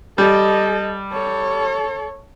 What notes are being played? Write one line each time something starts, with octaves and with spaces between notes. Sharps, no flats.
G3 A4 D#5
A4 C#5